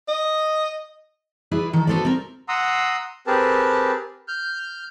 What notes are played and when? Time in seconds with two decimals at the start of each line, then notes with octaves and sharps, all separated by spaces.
0.08 D#5
1.51 E4 G#4 B4 D5
1.73 D#3 A4
1.87 B3 F#4 A4 C5 D5
2.05 C4 A#4
2.49 F#5 A#5 C6 D#6 E6
3.27 C4 G4 G#4 A#4 B4 A5
4.28 F6 G6